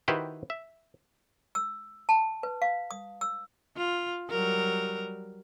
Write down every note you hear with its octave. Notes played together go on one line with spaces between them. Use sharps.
D#3 E4 F#4 G4 B4 C5
E5
E6
A5
B4
F5
D#6
E6
F4
F#3 G3 A#4